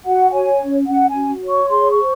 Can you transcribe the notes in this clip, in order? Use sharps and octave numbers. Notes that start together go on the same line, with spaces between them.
F#4 F#5
C#5 G#5
C#4
C#4 F#5
G#5
F#4
C#5
C#6
G#4 C6
C#6
C5